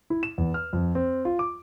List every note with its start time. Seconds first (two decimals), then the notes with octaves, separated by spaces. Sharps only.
0.10 E4
0.23 E7
0.38 E2
0.54 F6
0.73 F2
0.95 C4
1.25 F4
1.39 D6